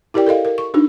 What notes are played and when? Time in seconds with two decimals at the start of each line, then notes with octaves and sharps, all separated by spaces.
0.14 E4 G4 A#4 D5 G5
0.26 A4 A#4 D#5 F5
0.45 A#4
0.58 C#6
0.74 D4 D#4 F#4